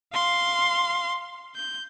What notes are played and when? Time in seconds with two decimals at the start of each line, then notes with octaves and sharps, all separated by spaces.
0.14 F5 C6
1.56 G6